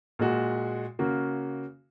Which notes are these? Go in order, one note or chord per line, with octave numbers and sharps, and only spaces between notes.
A#2 G#3 F#4
C#3 A#3 F#4